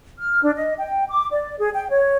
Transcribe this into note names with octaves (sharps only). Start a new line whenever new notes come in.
F6
D4
D#5
G5
D6
D5
G#4
G5
C#5